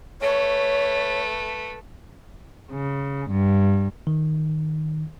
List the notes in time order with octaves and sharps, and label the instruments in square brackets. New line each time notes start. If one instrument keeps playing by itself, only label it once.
[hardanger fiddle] A3 B4 [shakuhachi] C#5
[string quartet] C#3
G2
[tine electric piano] D#3